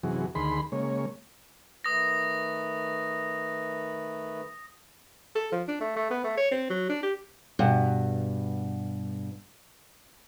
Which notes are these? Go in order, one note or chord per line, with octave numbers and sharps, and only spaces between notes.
F#2 C3 E3 F#4 G#4
D2 D#3 G#4 B5 C6
C#3 G#3 A#3 C#5
D#3 A3 B4 D#6 A#6
A4
F3
D4
A3
A3
B3
A3
C#5
C4
F#3
D4
G4
G2 B2